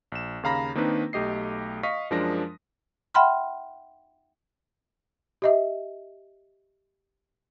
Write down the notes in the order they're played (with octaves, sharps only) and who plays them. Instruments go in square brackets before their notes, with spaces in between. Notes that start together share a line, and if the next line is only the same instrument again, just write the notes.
[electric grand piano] A#1 E7
D#2 C#3 F5 A#5 B5 A#6
D#3 A#3 C4 D4 D#4 B4
B1 A3 G4 D#5 C7
D#5 F5 C#6 D#6 B6
F#2 F3 G#3 D4 A#4 A#6
[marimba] E5 F#5 G5 B5 C6 F6
[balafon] G4 D#5 E5